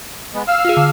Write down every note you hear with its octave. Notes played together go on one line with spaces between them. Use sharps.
G#3 B3
F5 E6 F6
F4 G#4
D3